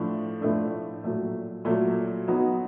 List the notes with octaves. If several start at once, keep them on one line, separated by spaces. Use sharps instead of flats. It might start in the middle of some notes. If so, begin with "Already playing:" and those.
Already playing: A2 F3 A3 D4
A2 F3 A3 D4
A#2 F#3 A3
A#2 F#3 A3
F#3 B3 D#4 F#4